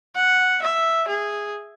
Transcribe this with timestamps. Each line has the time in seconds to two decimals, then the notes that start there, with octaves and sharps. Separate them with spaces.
0.15 F#5
0.62 E5
1.08 G#4